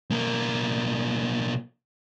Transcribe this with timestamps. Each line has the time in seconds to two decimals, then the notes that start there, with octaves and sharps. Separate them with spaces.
0.10 B1 A#3